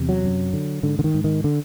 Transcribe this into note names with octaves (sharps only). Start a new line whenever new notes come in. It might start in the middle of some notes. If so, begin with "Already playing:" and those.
Already playing: E2 C3
F#3
F#2
D3
G#2 D3
D3
D#3
G#2
D#3
D3